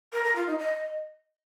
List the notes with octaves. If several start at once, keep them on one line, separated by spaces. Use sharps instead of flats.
A#4
A#4
F4
D#4
D#5